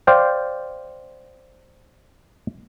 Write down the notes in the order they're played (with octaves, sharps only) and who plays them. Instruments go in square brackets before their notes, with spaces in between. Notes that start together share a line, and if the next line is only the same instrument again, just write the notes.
[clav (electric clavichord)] C5 D5 F5 G5